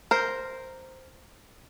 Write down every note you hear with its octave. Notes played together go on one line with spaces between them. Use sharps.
A#4 C5